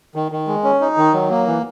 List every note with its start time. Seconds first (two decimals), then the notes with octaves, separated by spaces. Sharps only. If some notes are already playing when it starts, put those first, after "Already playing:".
0.15 D#3
0.32 D#3
0.48 G#3
0.64 C#4
0.81 D#4
0.97 D#3
1.14 F#3
1.30 A#3
1.46 E3